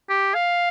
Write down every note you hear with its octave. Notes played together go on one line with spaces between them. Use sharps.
G4
F5